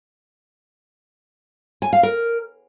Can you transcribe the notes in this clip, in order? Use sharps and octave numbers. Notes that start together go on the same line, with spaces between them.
G#5
F5
A#4